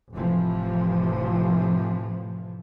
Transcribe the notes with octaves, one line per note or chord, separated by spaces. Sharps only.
F1 A2 C3 E3 F3